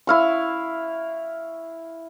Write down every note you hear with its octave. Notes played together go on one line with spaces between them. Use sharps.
E4 F5 C#6